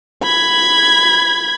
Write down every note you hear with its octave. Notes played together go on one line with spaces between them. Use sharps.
B5 G#6